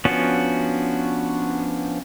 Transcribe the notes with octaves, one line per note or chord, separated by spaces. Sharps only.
F3 B3 C#4 D4 F#4